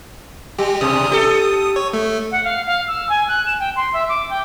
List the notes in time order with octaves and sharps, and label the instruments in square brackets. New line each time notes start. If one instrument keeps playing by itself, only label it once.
[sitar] G3 [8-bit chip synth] G4
[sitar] B2 [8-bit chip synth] D#6
[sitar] G4 A4
[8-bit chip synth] C#5
A3
[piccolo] F#5
F5
F5
E6
G#5
F#6
E7
G5
C6
E5
D6
G5